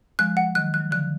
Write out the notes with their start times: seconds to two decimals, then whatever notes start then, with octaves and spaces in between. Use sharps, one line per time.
0.19 F3 G#3 F#6
0.37 F#5
0.55 D#3 F#3 F#6
0.74 F#6
0.80 F#3
0.91 D3 F3 F#6